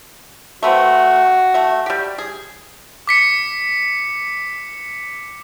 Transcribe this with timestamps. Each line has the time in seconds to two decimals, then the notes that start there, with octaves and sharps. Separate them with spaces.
0.63 A3 B3 C4 F#4
1.54 A3 E5
1.86 G3 G4
2.18 G#4
3.07 D6 B6 C#7